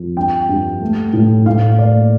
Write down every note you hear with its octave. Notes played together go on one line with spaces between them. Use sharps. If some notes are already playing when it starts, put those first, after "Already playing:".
Already playing: F2 F3
G2 G5
G2
A3
A2
A2 F5
A#3 D5